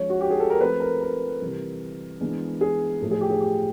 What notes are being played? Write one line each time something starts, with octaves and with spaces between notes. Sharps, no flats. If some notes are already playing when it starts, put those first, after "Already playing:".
Already playing: F3 G#3 C#4 C#5
F#4
G4
G#4
A4
A#4
F3 A3 C4 B4
A#4
A#4
C3 E3 G3
E3 G#3 B3 D4
G#4
A2 F3 A3 A4
G#4
G4
G#4
G4